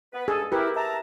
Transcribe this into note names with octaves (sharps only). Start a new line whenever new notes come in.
B3 B4
G2 G#4 A4
E4 G4 A#4 B4
E5 A5 A#5